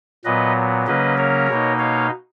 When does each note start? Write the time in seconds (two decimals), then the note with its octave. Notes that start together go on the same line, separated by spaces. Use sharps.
0.25 A#2 F#3 B3 B4 D#5
0.86 C#3 F#3 A#3 C#4 B4 D#5
1.17 A#4 C#5
1.48 B2 A#3 D#4
1.79 C#5 F5